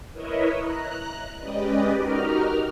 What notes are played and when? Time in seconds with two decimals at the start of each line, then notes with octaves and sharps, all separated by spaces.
0.12 E4 A#4 B4 C#5 D#5 E5
0.59 A#5 F#6
1.38 G#3 C#4 G4 B4 D5 D#5
1.96 D#4 F#4 G4 A#4 A#5 F6